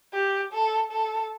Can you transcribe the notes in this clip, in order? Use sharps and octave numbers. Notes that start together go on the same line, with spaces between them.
G4
A4
A4